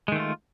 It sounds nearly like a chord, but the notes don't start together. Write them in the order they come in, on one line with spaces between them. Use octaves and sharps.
G#3 D#3 A3 F4